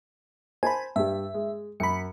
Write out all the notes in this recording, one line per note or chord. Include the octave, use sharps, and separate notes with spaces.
C5 G#5 A5 B5
G2 G3 E5
G#3
F#2 B5 C#7